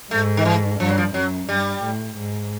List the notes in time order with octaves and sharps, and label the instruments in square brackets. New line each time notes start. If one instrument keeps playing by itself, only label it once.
[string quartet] G#2 [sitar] A3
[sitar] D#3
E3
[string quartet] G2 [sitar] F3
[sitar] F#3
F3
[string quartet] F#2 [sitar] F#3
[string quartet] G2 [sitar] G3
[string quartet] A2
G#2